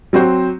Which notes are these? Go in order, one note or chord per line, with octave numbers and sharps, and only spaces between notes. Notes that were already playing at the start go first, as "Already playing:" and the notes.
F#3 C4 F#4 C5